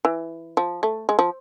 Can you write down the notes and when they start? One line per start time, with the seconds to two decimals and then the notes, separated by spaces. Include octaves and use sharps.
0.05 E3
0.57 F3
0.83 A3
1.09 G#3
1.19 F3